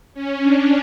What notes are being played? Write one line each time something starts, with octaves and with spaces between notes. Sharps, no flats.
C#4
D4